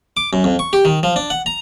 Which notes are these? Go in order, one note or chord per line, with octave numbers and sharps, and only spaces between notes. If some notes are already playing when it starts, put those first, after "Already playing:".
D6
F#2
F2
C#6
G4
D#3
F3
D4
F#5
A#5